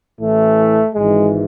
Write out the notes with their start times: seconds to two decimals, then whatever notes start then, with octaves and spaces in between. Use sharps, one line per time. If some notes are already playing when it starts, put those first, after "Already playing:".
0.20 A1 A2 E3 A3
0.95 G#1 G#2 E3 G#3